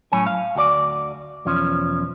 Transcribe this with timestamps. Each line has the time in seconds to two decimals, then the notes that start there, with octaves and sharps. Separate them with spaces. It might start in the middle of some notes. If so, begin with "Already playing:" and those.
0.12 A2 F#3 C#4 G#5
0.27 F5
0.55 D2 F#4 G4 D5
1.45 B1 E2 F3 C#4